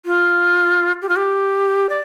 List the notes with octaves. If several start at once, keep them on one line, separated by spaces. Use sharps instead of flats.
F4
G4
F4
G4
D5